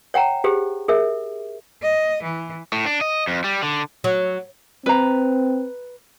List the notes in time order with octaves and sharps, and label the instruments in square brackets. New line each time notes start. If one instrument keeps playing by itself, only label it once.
[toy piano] C#5 F#5 G5 A#5
G4 G#4 C5
G#4 A#4 E5
[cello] D#5
E3
[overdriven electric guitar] A2
D4
D#5
F2
G3
D3
[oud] F#3
[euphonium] C4 [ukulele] B4 A#5